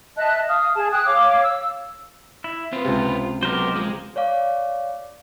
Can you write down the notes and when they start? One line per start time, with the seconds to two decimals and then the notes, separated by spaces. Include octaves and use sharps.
0.17 D#5 E5 A5 F#6
0.48 F5 D#6 F6
0.74 G#4 A5
0.91 G#4 G5 D#6 F#6
1.05 C#5 F5 D6
1.43 E6
2.44 E4
2.73 C4 F4 B4
2.85 C#2 C3
3.43 F#3 B3 G4 A#4 C5
3.76 F3 G#3 A#3
4.16 C#5 D5 F5 D6